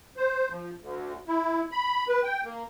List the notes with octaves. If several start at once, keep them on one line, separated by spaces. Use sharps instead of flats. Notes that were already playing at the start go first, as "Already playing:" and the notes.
C5
F3
D2
E4
B5
B4
G5
A#3